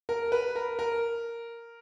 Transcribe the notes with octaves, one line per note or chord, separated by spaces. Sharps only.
A#4
B4
A#4
A#4